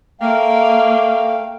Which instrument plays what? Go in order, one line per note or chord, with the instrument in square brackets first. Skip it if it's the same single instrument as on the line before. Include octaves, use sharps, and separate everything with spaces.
[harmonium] A3 F5 G5 [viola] A#3